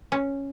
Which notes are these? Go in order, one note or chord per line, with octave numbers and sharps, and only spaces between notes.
C#4